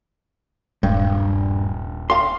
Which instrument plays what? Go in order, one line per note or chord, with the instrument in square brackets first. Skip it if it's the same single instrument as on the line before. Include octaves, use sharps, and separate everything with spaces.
[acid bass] D#1 [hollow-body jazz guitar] G2
[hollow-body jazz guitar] F5 C6